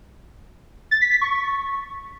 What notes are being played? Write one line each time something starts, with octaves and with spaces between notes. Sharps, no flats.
A6
B6
B6
C#6